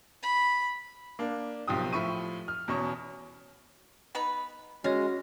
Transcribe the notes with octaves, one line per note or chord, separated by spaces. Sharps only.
B5
A#3 D4
F#1 B1 F3 C4 G4 D#6
A2 F3 E5 B5 C#6 D#7
F6
E2 B2 C#4 C#6
B3 D#4 B4
G#3 C#4 F#4 F5 A#6